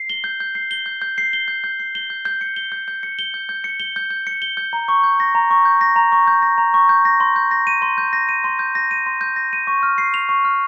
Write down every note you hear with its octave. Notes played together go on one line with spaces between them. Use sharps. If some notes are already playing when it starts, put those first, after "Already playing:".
Already playing: C7
G7
G6
G6
C7
G7
G6
G6
C7
G7
G6
G6
C7
G7
G6
G6
C#7
G7
G6
G6
C#7
G7
G6
G6
C#7
G7
G6
G6
C#7
G7
G6
A#5
C#6
G6
A#6
A#5
C#6
G6
A#6
A#5
C#6
G6
A#6
A#5
C#6
G6
A#6
C6
G6
A#6
D#7
C6
G6
A#6
D#7
C6
G6
A#6
D#7
C6
G6
A#6
D#7
C#6
F6
C7
F7
C#6
F6